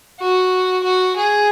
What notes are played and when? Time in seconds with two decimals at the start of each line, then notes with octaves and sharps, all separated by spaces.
0.19 F#4
0.83 F#4
1.16 G#4